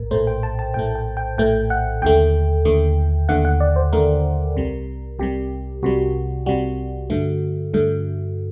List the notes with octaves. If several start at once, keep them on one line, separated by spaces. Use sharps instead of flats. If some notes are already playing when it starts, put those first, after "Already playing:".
Already playing: A#1 A2 A#4
A#1 A2 A3 C5
G5
A5
A5
A#1 A2 A3 G5
G5
G5
A#1 A2 A3 G5
F#5
D#2 D3 A3 G5
D#2 D3 A3
D#2 D3 A3 F#5
F#5
D5
C5
D#2 D3 A3 A#4
C2 C3 G3
C2 C3 G3 G4
C2 C3 G3 F#4
C2 C3 G3 F#4
G2 D3 A3
G2 D3 A3